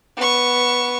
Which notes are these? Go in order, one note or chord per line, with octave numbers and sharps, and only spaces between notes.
B3 C#6